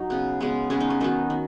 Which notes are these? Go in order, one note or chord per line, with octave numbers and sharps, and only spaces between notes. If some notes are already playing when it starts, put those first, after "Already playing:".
Already playing: F#3 D#4
C#3 B3
C#3 G#3 B3
C#3 G#3 B3 C#4
D#4
C#4
D#3 F#3 B3 D#4
D#3